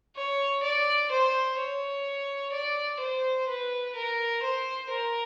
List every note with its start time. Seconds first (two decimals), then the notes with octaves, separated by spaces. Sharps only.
0.16 C#5
0.63 D5
1.11 C5
1.58 C#5
2.53 D5
3.00 C5
3.48 B4
3.95 A#4
4.42 C5
4.90 A#4